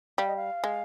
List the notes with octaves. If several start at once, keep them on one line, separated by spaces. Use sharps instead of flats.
G3 F5
D#5
F5
G#3